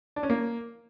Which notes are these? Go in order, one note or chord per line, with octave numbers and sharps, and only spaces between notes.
D4
C#4
A#3